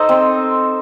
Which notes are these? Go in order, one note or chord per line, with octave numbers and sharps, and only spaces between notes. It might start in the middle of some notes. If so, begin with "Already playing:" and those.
Already playing: D#4 A4 C5 D#5
C4